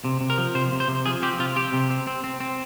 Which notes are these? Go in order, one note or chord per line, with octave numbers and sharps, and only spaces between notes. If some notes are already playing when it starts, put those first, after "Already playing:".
C3
C3
A#4
F3
C3 C5
C3
C5
C3
F3 G#4
C4 G4
C3 F4
C4 G4
C3
C4
C4
C4
C4